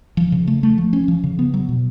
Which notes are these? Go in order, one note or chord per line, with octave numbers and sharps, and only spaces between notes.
F3
C#3
A3
A3
F3
C#4
F3
C#3
B3
F#3
B2